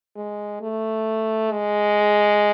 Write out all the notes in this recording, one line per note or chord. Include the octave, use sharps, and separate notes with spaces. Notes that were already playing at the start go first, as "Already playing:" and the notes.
G#3
A3
G#3